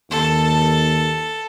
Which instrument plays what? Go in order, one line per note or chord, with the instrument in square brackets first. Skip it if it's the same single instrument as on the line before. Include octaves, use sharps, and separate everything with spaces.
[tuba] D#2 [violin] A4